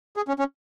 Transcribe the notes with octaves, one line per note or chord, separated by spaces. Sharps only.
G#4
C#4
C#4